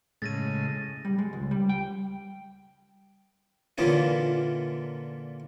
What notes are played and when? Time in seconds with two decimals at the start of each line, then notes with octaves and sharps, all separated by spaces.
0.22 A2 C#3 G#3 A6 A#6 D#7
1.05 G3
1.19 G#3
1.33 C#2
1.51 G3
1.69 G5
3.78 A#2 D3 E3 A#3 C#4 F4